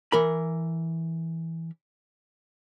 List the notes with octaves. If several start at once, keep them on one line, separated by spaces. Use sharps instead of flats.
E3 A#4 B5